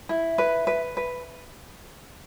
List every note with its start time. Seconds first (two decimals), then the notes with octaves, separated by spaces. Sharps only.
0.09 E4
0.38 B4
0.67 B4
0.97 B4